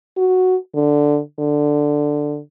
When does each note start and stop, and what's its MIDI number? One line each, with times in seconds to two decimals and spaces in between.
0.17 0.56 66
0.75 1.19 50
1.39 2.39 50